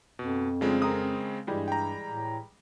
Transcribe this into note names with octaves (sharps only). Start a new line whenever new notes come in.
F2 B2
C#3 F3 G#3 A3 C4 D4
A#4 A#5 D#6
G2 E3 G3 G#3
G5 A#5
A2